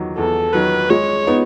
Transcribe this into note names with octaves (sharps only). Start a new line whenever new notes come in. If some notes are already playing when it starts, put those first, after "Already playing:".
Already playing: E2 D#3 F#3
E2 A4
D#3 F#3 B4
G#3 C#5
B3 D#4